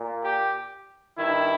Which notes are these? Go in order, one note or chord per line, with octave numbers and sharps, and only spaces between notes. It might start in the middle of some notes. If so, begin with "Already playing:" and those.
Already playing: A#2
G4
G2 D#3 E4